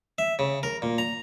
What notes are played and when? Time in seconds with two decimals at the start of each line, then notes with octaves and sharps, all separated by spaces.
0.18 E5
0.39 C#3
0.63 A#4
0.82 A#2
0.98 A#5